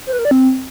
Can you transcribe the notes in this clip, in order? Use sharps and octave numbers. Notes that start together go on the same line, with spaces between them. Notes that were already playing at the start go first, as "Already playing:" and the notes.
C5
B4
A#4
D5
C4